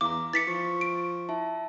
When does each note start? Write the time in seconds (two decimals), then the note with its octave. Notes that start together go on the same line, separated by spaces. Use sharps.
0.01 E2 F5 A#5 D6
0.33 E3 A6 B6 C#7
0.48 F3 C#6
0.81 D7
1.29 E4 E5 A5